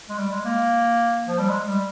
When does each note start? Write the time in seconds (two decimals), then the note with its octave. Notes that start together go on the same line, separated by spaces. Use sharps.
0.09 G#3
0.18 G3
0.31 G#3
0.45 A#3
1.28 F3
1.39 G3
1.49 G#3
1.66 G3